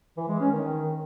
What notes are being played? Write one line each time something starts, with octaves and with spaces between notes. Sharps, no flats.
E3
G#3
C#4
D#3